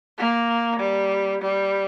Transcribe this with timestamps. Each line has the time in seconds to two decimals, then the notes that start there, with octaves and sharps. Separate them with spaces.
0.18 A#3
0.80 G3
1.42 G3